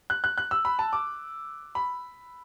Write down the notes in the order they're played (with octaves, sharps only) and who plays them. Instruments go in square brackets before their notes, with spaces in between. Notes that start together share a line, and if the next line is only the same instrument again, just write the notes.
[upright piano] F#6
F#6
F#6
E6
B5
A5
D6
B5